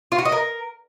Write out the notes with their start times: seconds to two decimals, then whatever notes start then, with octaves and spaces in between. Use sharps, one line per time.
0.12 F4
0.18 F#4
0.25 D#5
0.32 A#4